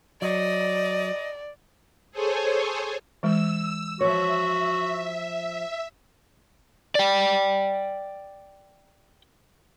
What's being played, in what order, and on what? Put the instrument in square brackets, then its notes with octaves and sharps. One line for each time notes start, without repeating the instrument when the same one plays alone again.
[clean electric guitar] F#3 [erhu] D5 [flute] D#5
[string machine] G#4 A4 C5 C#5 G#5
[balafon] E3 G#3 [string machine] E6
[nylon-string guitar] F3 C#5 [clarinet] F#4 [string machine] E5
[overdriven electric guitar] D5 G5